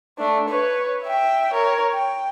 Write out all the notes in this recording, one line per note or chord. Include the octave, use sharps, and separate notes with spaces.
A3 D4
B4 C#5
E5 G5
A#4 C#5
G5